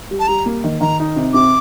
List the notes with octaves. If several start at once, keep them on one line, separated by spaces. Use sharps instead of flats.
G3
A5
G3 A#5
A#3
D#3
D#3 A#5
D#4
C3
C3 D6